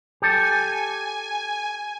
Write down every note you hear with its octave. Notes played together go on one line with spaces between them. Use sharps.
G4 A4 G#5